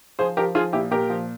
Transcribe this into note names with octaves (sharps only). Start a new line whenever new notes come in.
F3 G#4 C5
F3 G4 A#4
F3 F4 G#4
A#2 E4 G4
A#2 G4 A#4
F3